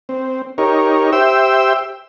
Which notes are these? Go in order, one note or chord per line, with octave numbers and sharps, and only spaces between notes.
C4
D#4 G4 A#4 C#5
G4 C5 E5 G5 E6